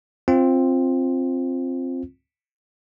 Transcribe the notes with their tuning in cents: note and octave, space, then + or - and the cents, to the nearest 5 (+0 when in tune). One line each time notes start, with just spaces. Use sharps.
C4 +10 F4 +0